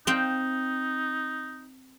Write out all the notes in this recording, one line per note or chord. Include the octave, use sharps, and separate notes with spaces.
C4 D#4 F5 G5